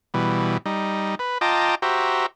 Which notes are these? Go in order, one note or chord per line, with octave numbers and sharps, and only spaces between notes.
B2 E3 G3
G3 D#4
B4
F4 D#5 G5 A5 A#5 D6
F#4 G4 C5 E5 A#5